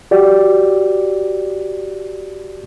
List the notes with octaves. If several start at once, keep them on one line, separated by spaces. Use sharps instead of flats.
F#4 G4 D5